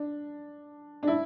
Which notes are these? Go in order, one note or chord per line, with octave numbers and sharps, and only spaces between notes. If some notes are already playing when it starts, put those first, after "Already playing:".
Already playing: D4
D4
E4